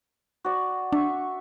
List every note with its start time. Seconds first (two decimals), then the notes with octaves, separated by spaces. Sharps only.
0.44 F#4 D5
0.93 D4 E5 C#6